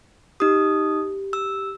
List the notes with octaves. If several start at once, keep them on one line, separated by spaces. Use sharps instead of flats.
D#4 G4 D#6
E6